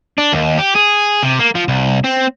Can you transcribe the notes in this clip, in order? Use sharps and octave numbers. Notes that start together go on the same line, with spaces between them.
D4
D#2
G4
G#4
C3
A#3
F3
C2
C4